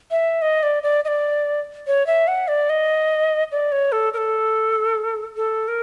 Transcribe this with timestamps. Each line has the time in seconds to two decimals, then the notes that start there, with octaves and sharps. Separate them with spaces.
0.11 E5
0.42 D#5
0.63 D5
0.83 D5
1.05 D#5
1.08 D5
1.87 C#5
2.07 E5
2.27 F#5
2.48 D5
2.69 D#5
3.52 D5
3.72 C#5
3.92 A4
4.13 A#4
4.17 A4
5.37 A4
5.68 A#4